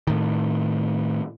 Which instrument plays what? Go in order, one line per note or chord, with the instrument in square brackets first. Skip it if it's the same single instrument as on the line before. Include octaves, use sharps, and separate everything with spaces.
[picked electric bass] A2 D#3